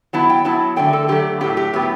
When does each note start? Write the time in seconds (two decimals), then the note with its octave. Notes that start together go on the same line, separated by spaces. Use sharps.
0.13 F#3 B3 E4 A5
0.30 G5
0.45 F#3 B3 E4 A5
0.76 D3 F#3 A3 G5
0.93 A4
1.08 D3 F#3 A3 G4
1.41 A2 F#3 B3 G4
1.57 G4
1.73 A2 F#3 B3 G4